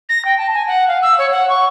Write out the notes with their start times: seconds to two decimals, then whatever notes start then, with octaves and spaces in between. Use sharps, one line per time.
0.09 A#6
0.25 G5
0.38 A5
0.54 G#5
0.67 F#5
0.88 F5
1.02 E6
1.18 C#5
1.32 F#5
1.49 C#6